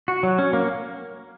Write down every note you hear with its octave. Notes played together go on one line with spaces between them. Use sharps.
F#4
F#3
C#4
A#3